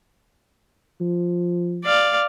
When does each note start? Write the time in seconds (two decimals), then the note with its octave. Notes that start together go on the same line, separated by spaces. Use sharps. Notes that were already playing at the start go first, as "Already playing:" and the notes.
1.01 F3
1.85 D5 F5